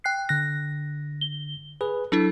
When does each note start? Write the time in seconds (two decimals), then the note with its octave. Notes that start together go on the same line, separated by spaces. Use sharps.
0.04 G5 F#6 C7
0.29 D3 F#6 A#6
1.21 G7
1.81 G#4 B4
2.12 F#3 D4 E4 A4